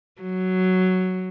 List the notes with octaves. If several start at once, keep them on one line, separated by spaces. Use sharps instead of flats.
F#3